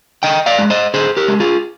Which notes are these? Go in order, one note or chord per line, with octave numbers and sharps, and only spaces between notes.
D3 D#5 G5
D5 F5
G#3
C5 D#5
D3 G#4 C5
G4 A#4
G#3
F4 G#4